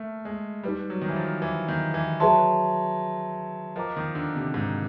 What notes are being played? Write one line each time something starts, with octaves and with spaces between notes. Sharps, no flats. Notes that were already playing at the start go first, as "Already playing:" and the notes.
Already playing: A3 A#3
G#3
G3 D#4 G4 B4 D5
F#3
D#3
E3
F3
E3
D#3
E3
F#3 G#4 B4 E5 A5 C6
F3 A#4 D#5 G5 A#5 D6
D#3
D3
C3
G#2